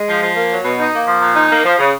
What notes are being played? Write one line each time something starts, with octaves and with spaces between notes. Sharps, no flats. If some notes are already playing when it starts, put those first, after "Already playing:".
Already playing: G#3
F3
F3
A#3
F#3
B2
D#4
A#3
F3
A#2
D#4
A#3
F3
C#3